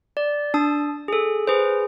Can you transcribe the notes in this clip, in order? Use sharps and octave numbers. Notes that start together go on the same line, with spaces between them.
D5
D4 A5 D#6
G#4 A4
G#4 B4 C5